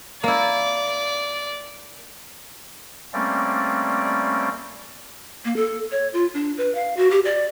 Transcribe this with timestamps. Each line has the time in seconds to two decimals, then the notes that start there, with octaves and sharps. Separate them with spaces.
0.23 A#3 E4 D5
3.13 G3 A3 A#3 C4 C#4 D5
5.45 A#3
5.56 A4
5.92 C#5
6.13 F4
6.34 D4
6.58 B4
6.75 F5
6.97 F#4
7.11 G4
7.25 D5